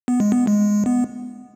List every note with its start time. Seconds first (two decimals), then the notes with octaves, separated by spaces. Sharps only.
0.08 B3
0.20 G#3
0.32 B3
0.47 G#3
0.86 B3